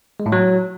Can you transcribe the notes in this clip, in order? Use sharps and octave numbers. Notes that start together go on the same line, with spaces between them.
G#3
A2
F#3